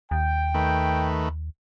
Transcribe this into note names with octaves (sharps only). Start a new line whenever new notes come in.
D#2 G5
D#3 A3 B4